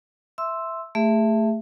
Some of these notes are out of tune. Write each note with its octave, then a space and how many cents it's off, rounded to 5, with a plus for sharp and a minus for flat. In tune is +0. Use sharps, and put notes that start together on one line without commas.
E5 +0 C6 +0 E6 +0
A3 +10 G#4 -30 E5 +10